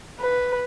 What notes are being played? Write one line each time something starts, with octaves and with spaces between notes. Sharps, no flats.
B4